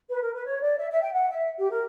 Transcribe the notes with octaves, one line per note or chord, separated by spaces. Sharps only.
B4
A#4
B4
C#5
D5
E5
E5
G5
F#5
E5
G4
A#4